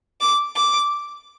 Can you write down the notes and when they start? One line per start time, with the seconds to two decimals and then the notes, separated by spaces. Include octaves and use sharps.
0.21 D6
0.56 D6